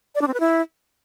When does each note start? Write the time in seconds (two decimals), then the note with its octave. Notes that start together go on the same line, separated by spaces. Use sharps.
0.15 D5
0.21 D4
0.28 C4
0.34 B4
0.40 E4